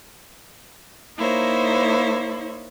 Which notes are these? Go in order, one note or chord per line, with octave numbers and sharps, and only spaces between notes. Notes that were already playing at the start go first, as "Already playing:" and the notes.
A#3 D#4 E4 C5 C#5